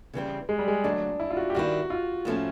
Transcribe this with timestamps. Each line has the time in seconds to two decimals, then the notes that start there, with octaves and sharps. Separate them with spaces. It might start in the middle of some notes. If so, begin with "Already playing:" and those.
0.14 C#3 E3 G3 C4
0.49 G#3
0.59 G3
0.68 G#3
0.84 F2 D3 F#3 A3 D4
1.20 E4
1.30 F4
1.37 F#4
1.50 G4
1.55 G2 D#3 G3 C4 E4 F#4
1.90 F4
2.25 A2 F3 A3 C#4